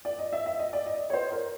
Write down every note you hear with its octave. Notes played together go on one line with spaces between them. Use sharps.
D5
D#5
E5
E5
D#5
D5
D#5
C#5
C5
A#4